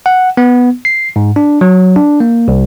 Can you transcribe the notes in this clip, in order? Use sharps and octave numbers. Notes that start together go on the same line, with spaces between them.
F#5
B3
C7
G#2
D4
F#3
D4
A#3
C2